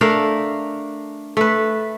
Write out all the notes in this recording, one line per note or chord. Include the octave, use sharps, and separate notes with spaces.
A3 D4 A#4 F5
A3 B4